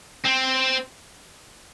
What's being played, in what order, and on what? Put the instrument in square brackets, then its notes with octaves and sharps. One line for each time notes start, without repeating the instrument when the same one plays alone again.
[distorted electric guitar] C4